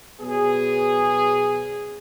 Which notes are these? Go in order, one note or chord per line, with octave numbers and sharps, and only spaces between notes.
B2 F#3 B3 G#4